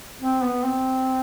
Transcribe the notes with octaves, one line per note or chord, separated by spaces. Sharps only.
C4
B3
C4